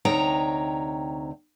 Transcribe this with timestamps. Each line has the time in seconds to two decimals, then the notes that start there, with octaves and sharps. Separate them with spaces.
0.05 D2 C3 D#4 C#5 G5 A#5